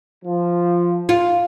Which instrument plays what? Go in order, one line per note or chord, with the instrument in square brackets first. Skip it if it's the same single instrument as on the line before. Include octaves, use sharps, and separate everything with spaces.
[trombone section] F3
[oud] F4